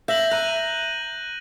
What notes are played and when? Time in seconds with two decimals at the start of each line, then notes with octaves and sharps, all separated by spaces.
0.08 E5 G6 A#6 F#7
0.31 A#5 F#6 D#7